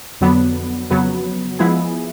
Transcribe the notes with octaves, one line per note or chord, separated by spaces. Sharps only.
F2 D3 F#3 B3 D4
F2 C#3 F#3 B3
F3 G#3 B3 E4 G#4